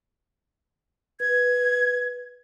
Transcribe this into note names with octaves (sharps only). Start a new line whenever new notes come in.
B4 G#6